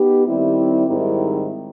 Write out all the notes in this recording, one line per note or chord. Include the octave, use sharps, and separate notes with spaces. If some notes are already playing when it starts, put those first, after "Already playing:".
Already playing: B3 D#4 G4
D#3 G3 C4 E4
G#2 D#3 G3 C4 E4